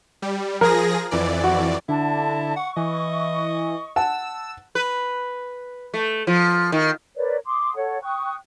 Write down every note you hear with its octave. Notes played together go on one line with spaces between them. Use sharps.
G3
F3 G#4 A#4 A#6
F2 E3 D5
F#4
D3 E4 A5
F#5 C#6
E3 D#5
F#5 A5 E6
B4
A3
F3
D#3
A#4 B4 C#5 D5
C6 D6 D#6
A4 C#5 F#5
G5 C#6 D#6 F#6